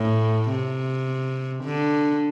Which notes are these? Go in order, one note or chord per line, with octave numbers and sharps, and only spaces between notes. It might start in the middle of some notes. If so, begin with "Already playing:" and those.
Already playing: A2
C3
D3